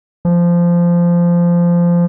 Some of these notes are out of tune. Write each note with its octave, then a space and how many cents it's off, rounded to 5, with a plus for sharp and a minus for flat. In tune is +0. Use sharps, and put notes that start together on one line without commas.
F3 -15